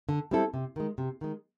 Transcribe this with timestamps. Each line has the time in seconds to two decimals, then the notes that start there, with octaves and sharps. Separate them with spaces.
0.09 D3
0.31 G3 C4 E4 A4
0.54 C3
0.76 D#3 G#3
0.98 C3
1.21 D#3 G#3